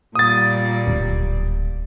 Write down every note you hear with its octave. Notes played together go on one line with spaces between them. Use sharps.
A#2 G3 D#6 A6
D1